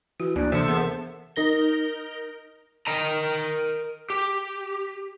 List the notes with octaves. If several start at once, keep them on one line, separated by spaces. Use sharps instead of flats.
E3 F#4
D2 A#3 D4
C3 E3 D4 A4 C5 E5
B3 G#4 A#4
D#4 A#4 A#6 G7
A#4 D#5 G5 A#5
G4